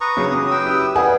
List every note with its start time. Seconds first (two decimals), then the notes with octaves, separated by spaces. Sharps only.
0.01 B4 A#5 C#6 D#6
0.17 C#3 F#3 G#4
0.31 C#4 G4
0.51 B4 G5 E6
0.64 E4 G4
0.96 G3 G#4 B4 F#5 G#5